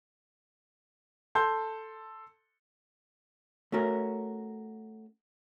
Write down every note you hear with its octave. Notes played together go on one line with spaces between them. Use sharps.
A4 C6 G6
A3 C#4 F#4 A#4